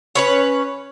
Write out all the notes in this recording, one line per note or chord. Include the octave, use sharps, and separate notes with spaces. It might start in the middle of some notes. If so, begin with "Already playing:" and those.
C#4 B4 C#5